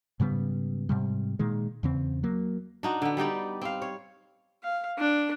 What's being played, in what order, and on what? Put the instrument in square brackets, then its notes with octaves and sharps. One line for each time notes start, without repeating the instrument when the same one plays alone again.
[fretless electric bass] G#2 C#3 G3 B3
G#2 C3 G3
A#2 D#3 G#3
E2 C#3 C4
F#3 A#3
[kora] D4 D#4 F#4
D3 B3
G3 D#4 G4 D5
C4 F5
C#5
[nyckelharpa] F5
D4